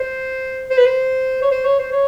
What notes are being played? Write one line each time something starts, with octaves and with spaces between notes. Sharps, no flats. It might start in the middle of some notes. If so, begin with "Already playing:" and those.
Already playing: C5
C5
B4
C5
C#5
C5
C#5
C5
C#5